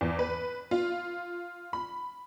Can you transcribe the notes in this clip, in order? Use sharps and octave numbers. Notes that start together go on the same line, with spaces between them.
E2
B4
F4
B5